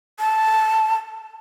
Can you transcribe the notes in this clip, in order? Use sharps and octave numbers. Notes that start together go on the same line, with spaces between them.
A5